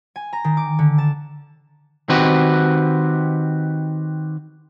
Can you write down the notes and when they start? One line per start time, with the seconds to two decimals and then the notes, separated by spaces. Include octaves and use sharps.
0.16 G#5
0.33 A#5
0.44 D#3
0.57 D6
0.79 D3
0.98 A5
2.09 D#3 C4 F#4 G4 B4